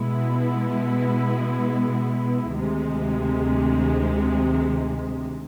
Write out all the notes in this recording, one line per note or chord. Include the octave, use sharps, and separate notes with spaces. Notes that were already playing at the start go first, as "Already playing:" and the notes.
Already playing: B2 G#3 B3 E4
D2 C3 D#3 G#3